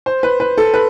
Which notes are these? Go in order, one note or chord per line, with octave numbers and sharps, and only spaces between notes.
C5
B4
B4
A4
B4